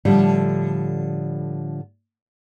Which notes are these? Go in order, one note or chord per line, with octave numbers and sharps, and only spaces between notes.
A2 D3 F3 G3